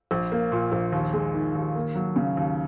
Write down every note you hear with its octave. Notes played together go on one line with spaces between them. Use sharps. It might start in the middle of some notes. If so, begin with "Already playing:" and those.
A#1
A#3
A#2
A#1
D#2
G#3
D#3
D#2
A#3
F#3
C#3
D#2